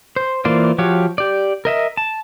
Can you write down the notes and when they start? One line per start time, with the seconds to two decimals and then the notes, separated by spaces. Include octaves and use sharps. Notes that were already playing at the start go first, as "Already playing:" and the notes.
0.16 C5
0.45 E3 A#3 F4 C5 D5
0.78 F3 F#4 G4 C#5 F5
1.18 G4 D5
1.65 A#4 D#5 E5
1.97 A5